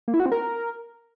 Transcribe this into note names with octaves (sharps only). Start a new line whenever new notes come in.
A#3
E4
F#4
C4
A#4